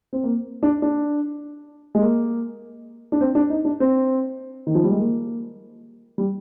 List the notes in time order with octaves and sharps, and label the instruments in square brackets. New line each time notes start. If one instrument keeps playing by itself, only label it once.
[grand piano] C4
A#3
D4
D4
G#3
A#3
D4
C4
D4
D#4
D4
C4
D#3
F3
G3
G#3
A#3
G3